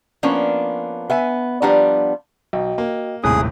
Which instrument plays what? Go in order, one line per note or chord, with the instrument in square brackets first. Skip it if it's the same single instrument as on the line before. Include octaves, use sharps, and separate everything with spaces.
[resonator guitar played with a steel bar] F3 A#3 B3 C#4 D4
B3 E5 G#5
F3 G3 B3 D4 F#5 A#5
[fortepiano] B1 [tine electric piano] F#4 D#5 G5
[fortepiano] A#3
[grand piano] D#1 G#1 C3 [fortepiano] A2 [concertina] G#4 [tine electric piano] D#6 F#6